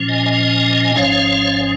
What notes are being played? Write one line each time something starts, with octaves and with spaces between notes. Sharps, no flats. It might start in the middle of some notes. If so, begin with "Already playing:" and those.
Already playing: A#2 F3 C#4
D#5 G#5
D#5 G#5
G#5
G#1 G#2 F3 C#4 C#5 F5